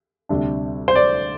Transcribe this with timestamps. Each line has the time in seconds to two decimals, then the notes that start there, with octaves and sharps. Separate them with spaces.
0.29 D2 C3 G3 D4
0.88 C5
0.95 D5